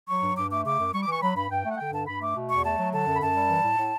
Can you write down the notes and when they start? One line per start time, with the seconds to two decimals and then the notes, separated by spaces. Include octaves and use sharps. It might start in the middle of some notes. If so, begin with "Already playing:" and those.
0.08 F#3 C#6
0.22 G2
0.36 G2 D6
0.50 A3 D6
0.65 C#3 D6
0.78 F#2
0.93 G3 C#6
1.02 D6
1.07 E3 C#6
1.22 F#3 B5
1.36 G2 B5
1.50 G2 G5
1.65 A3
1.71 F#5
1.78 D3 G5
1.93 G2 A5
2.07 G2 B5
2.22 A3 D6
2.35 B2
2.49 E2 C#6
2.65 A3 A5
2.79 F#3
2.93 D3 A5
3.07 F#2
3.16 B5
3.21 F#2 A5
3.35 G3
3.50 E3
3.63 A2
3.77 A2